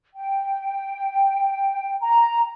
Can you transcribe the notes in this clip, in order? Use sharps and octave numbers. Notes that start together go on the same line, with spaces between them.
G5
A#5